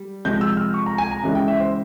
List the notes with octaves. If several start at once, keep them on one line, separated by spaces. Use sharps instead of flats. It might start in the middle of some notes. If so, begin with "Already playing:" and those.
Already playing: G3
C3 F3 G#3 G6
E6
F6
C#6
A#5
G#5
A#5
C#3 E3 G#3
G5
E5
C5